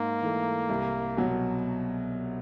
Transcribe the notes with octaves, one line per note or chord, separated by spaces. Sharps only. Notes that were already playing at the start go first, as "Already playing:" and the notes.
Already playing: G#2 A#3
E3 A3
C2
B2 F#3